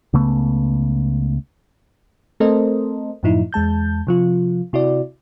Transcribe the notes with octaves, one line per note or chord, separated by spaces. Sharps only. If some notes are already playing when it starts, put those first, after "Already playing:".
C#2 C#3 A3 B3
A3 C4 A4 A#4 C5 D#5
F#2 A2 F3 D#4 E4
E2 G#3 A5 G6
C3 F3 F4
C3 E4 F#4 D5